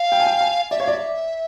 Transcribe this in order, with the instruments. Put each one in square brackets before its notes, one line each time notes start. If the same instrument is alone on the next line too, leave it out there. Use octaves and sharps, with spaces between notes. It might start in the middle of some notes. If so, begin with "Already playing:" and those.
Already playing: [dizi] F5
[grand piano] G5
G#5
G5
G#5
[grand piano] D5 [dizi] E5
[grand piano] C#5 [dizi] F5
[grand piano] D5 [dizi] E5